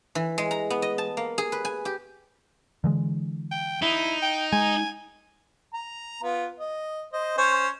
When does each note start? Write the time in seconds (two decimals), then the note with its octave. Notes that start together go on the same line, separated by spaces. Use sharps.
0.15 E3
0.38 G#3
0.51 A#5
0.70 B3
0.82 D#5
0.98 A5
1.17 A#3
1.38 G#4
1.52 B4
1.65 G#5
1.85 G4
2.84 D3 E3 G#3
3.51 G5
3.82 D#4 E4
4.22 G5
4.53 G#3 G#5
5.74 A#5
6.23 B3 F4
6.60 D#5
7.13 C5 D#5
7.38 C#4 C5 C#5